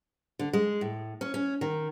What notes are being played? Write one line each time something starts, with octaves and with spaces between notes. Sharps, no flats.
D3
G#3
A2
C#4
C#4
D#3